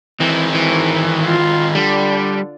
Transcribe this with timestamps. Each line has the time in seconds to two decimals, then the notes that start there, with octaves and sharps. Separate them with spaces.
0.20 D#3 E3 C4
0.55 E3
1.25 F4
1.75 D3 G3